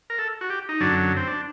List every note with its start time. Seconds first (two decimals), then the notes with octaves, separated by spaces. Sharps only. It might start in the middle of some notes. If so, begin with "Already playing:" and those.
0.10 A#4
0.19 A4
0.41 F#4
0.50 G4
0.69 D#4
0.80 F#2 D3 F#3 D4
1.17 C4
1.27 D4